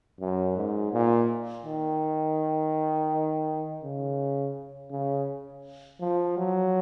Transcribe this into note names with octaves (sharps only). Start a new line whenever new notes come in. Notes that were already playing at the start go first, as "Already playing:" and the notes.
F#2
G#2
A#2
D#3
C#3
C#3
F3
F#3